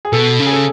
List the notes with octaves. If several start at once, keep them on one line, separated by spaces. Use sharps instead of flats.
G#4
B2 A4
C#3
G#4
A4